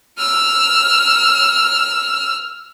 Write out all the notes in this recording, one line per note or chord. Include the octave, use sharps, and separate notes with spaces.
E6 F6